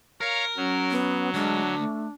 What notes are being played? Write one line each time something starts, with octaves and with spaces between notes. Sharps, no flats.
A#4 C#5 F5 A#5
F#3 C#4
B3
D2 G#3 D4
A3